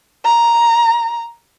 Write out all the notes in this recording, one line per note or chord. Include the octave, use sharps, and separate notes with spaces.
A#5